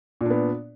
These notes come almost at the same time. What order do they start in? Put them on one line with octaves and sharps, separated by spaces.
A#2 D4 B3